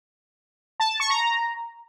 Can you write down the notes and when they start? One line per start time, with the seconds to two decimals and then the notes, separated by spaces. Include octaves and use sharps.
0.80 A5
0.90 A5
1.00 C#6
1.10 A#5